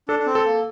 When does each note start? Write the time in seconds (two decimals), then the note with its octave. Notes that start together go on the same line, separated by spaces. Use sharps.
0.08 D4 A4
0.19 D4
0.26 C4
0.35 A4
0.45 A#3